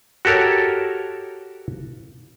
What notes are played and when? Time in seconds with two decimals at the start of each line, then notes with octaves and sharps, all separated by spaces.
0.25 F#4 G4 A4 A#4 C#5